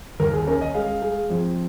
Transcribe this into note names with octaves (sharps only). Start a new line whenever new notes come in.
D#2 A#4
G#4
C#4 A#4
D#5
G#3 F5
G#3
F2